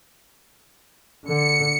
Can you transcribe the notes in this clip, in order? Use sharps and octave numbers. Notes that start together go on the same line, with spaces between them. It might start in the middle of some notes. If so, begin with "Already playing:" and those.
D3 C#7